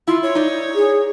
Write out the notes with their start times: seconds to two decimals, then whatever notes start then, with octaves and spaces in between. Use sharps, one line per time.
0.07 E4 F4
0.23 C#5
0.35 D#4 D5
0.75 G#4